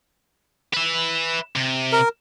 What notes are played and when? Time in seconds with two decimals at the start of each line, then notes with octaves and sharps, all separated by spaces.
0.74 B4 E5
1.56 C3
1.92 A#4